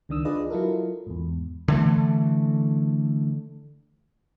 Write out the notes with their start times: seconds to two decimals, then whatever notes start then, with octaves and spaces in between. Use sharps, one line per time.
0.09 C#2 D#3 D4 D#6 E6
0.25 D4 F4 G#4 B4 D5 D#5
0.50 F#3 E4 F4 A4 A#4
1.07 E2 G#2
1.68 D3 E3 A3